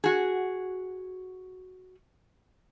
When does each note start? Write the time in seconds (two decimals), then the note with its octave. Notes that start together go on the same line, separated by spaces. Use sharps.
0.04 F#4 G#4